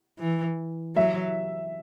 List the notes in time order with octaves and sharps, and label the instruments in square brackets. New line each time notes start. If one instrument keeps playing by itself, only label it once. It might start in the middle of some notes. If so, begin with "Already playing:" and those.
[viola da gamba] E3
[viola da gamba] F#3 [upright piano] E5